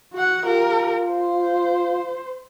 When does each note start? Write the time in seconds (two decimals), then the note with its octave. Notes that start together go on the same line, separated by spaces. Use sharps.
0.13 F#4 F#5
0.45 F4 G4 A#4
1.11 C5